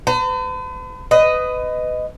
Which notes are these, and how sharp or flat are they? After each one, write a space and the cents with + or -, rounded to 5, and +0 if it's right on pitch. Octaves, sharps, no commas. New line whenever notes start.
B4 +45 A#5 -40
B4 +25 D#5 +0